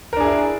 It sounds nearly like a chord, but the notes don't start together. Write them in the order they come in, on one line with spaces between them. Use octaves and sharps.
A#4 D4 G#4 E4